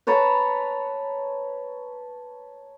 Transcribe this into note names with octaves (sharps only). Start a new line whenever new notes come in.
B4 C#5 A5 A#5